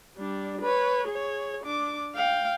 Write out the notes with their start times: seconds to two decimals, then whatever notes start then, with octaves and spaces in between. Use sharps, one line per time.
0.18 G3 D4
0.61 B4 C#5
1.08 G#4 C#5
1.64 D4 D6
2.15 F5 G5